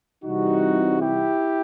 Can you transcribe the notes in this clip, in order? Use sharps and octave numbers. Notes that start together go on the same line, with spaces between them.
C2 C3 E3 G3 D#4 F#4
E4 G4